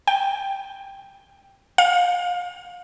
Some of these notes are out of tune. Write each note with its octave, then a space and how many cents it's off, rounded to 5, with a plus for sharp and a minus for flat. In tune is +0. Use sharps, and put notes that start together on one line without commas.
G5 +5
F5 +30